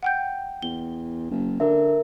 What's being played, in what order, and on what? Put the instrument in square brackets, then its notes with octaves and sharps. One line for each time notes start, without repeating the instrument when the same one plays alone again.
[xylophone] F#5 G5 G6
[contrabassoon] E2 [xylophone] G7
[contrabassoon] F#1
[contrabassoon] D3 [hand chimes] A#4 E5